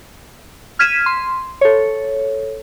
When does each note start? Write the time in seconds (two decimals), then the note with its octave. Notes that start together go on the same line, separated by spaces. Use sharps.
0.79 F6 G#6 B6 D#7 E7
1.06 C6
1.61 A4 C#5